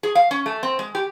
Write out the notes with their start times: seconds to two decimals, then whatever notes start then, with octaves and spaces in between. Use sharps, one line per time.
0.03 G#4
0.15 F5
0.31 C#4
0.46 A3
0.63 C4
0.79 G#3
0.95 G4